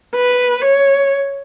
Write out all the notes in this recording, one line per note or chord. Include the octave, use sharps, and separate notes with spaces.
B4
C#5